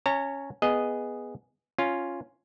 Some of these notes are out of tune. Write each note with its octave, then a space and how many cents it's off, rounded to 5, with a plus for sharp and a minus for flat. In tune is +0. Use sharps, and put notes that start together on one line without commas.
C#4 +0 C#5 +0 A#5 -35
B3 +0 G#4 +0 D#5 +0
C#4 +0 F4 +0